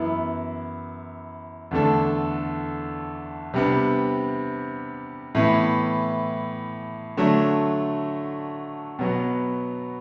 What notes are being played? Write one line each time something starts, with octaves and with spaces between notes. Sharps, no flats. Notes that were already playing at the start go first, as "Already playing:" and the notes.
Already playing: F#2 E3 B3 E4
E2 D3 A3 D4 A4
C3 G3 B3 D4
A2 E3 B3
D3 F#3 A3 D4
B2 F#3 B3